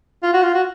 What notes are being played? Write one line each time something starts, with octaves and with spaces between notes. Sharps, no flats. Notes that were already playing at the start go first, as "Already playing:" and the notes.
F4
F#4
F4
F#4